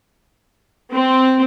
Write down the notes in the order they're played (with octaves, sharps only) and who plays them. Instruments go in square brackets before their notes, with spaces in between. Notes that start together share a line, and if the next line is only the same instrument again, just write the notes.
[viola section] C4